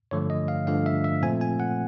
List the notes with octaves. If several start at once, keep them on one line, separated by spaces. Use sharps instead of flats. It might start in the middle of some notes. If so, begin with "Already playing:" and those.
G2 D3 F3 A3 C#5
D#5
F5
G2 D3 F3 A3 F5
E5
E5
A#2 F3 A3 C4 G#5
G#5
F#5